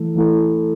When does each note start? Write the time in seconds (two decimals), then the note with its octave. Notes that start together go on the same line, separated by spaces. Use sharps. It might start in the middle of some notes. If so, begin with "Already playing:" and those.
Already playing: E3 A3 E4 A4
0.15 E3 A3 E4 A4